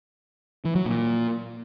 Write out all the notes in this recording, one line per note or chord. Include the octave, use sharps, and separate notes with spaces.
E3
F#3
A#2